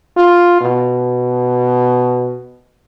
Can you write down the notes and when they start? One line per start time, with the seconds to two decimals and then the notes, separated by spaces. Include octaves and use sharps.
0.17 F4
0.61 B2